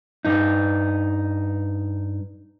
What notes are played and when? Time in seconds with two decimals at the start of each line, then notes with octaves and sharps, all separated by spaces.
0.25 G2 D#4